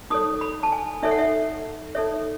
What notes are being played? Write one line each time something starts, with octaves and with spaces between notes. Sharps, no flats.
D#4 A4 C#5 D#6
B5
A5
G#5
D#4 A4 C#5 E5
F#5
E5
D#4 A4 C#5 E5